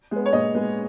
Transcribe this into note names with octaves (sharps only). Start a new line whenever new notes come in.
G#3 B3
C#5
A#2 D#5
G#3 B3